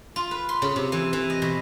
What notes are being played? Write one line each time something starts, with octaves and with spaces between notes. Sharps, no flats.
F4
B4
C6
C#3
C3
E3
E3
D#5
B2